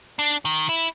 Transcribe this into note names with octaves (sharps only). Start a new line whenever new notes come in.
D4
D#3
E4